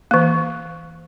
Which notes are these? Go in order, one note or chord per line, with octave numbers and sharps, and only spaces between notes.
E3 A#3